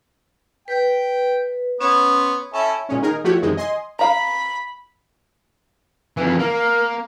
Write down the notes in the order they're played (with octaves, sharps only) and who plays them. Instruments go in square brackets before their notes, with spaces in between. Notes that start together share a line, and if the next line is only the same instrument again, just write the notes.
[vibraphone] B4 [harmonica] G5
[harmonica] B3 C#5 [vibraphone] C#4 C6
[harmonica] C#4 E4 A4 [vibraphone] E5
[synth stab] A#2 G#3 C#4
D#3 D#4 G#4 A#4
F3 A3 E4 F#4 G4 C#5
F#2 C3 D#3 E3 G#3
D#5 G#5 C6
[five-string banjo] F5 A#5 [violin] B5
[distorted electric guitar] F2 E3 [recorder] B4
[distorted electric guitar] A#3 [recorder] A#4